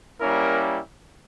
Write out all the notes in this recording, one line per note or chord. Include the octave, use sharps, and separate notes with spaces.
G3 A#3 C#4 E4 A#4